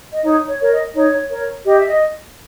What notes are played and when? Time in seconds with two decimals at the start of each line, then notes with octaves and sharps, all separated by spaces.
0.12 D#5
0.24 D#4 C#5
0.48 C#5
0.59 A#4 C#5
0.71 D#5
0.94 D#4 C#5
1.30 A#4 C#5
1.65 G4 D#5
1.77 E5
1.87 D#5